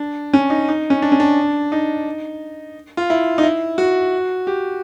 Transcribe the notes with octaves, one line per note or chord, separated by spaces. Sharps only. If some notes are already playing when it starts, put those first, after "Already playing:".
Already playing: D4
C#4
D#4
D#4
C#4
D4
C#4
D4
D#4
F4
E4
D#4
E4
F#4
G4